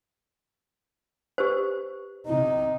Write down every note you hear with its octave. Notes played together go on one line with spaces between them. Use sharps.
G4 B4 C5
C3 D#4